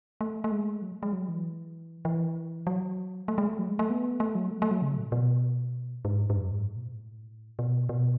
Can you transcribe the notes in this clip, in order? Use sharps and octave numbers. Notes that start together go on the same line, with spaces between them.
A3
A3
G#3
F#3
G#3
G#3
F#3
E3
E3
F#3
A3
G#3
A3
F#3
G#3
A3
B3
A3
F#3
A3
A3
F#3
C#3
A2
B2
G#2
G#2
F#2
G#2
A2
B2
A2
B2
B2